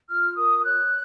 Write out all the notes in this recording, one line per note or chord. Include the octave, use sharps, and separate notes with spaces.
F4 F6
A#4 D#6
C#5 F#6